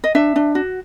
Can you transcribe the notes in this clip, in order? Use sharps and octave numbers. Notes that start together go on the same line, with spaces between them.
D#5
D4 E5
D4
F#4